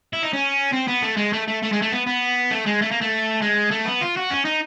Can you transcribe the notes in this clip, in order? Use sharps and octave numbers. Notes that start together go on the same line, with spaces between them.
E4
D#4
C#4
C4
B3
A3
G#3
A3
A3
A3
G#3
A3
B3
B3
A3
G#3
A3
A#3
A3
G#3
A3
B3
F4
F#4
C#4
D#4